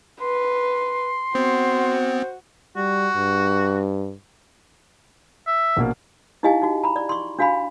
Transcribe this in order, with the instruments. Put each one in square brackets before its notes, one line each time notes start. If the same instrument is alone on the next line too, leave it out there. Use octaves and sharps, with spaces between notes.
[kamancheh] B4 [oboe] C6
[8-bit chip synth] B3 C4 [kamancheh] F#4 [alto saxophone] C5
[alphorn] G3 [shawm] F#4
[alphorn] G2
[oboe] E5
[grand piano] A#1 B2 A#3
[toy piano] D#4 E4 G4 D#5 F5 G#5
D#4 F#4
A#5 B5
D5
C6 C#6
D4 F#4 F5 G#5 B5